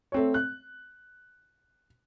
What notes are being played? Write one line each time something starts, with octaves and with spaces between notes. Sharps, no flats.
A3 C4 C#5
F#6